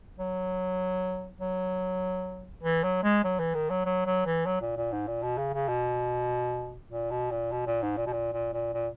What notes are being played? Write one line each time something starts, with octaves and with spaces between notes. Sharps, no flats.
F#3
F#3
E3
F#3
G#3
F#3
E3
D#3
F#3
F#3
F#3
E3
F#3
A#2
A#2
G#2
A#2
B2
C#3
C#3
B2
A#2
B2
A#2
B2
A#2
G#2
A#2
B2
A#2
A#2
A#2
A#2